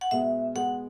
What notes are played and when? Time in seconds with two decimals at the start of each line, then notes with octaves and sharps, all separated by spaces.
0.01 F#5
0.11 B2 G#3 B3 E5
0.55 B2 G#3 B3 F#5